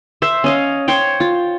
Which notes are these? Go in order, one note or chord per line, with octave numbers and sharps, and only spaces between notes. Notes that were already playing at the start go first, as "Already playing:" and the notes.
C5 E5
C#4 D#5 F5
C5 C#5 G5
F4